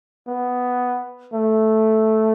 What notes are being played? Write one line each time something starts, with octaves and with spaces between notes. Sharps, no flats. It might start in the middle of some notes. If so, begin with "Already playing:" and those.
B3
A3